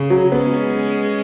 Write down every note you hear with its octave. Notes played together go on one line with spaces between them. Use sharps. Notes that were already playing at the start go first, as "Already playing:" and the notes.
Already playing: C#3
F#3
G#3 B3 C#4